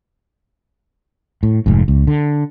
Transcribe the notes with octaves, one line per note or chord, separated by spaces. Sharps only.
A2
F1 G#2
C#2
D3